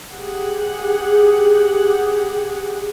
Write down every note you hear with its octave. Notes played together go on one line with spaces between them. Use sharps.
G4 G#4 F#5